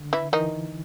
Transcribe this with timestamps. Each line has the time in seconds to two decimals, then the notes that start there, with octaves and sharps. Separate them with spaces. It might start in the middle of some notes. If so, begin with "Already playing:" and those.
Already playing: D3
0.13 E3 E4
0.33 D#3 E3 D#4